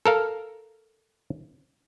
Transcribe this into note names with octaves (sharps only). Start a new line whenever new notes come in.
A4 A#4 F5